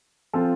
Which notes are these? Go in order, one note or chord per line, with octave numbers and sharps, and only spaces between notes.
F3 C4 F4 A4